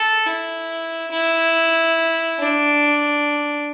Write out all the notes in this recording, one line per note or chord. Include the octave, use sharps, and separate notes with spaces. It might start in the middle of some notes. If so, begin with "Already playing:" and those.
Already playing: A4
E4
E4
D4